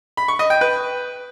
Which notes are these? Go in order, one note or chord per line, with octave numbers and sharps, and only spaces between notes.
B5
C#6
D#5
G5
B4